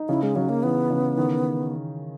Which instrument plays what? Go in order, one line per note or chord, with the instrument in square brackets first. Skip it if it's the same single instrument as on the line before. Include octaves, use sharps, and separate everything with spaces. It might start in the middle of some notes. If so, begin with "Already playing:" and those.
Already playing: [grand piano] D#4
[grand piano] C#3 [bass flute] E4
[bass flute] G#3
[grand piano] C#3 [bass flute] F#3
[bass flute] A#3
[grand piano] E3 [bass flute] B3
[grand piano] C#3
D#3